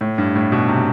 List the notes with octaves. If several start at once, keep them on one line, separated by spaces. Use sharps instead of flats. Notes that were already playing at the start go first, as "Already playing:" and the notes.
A2
G2
A2
B2
C3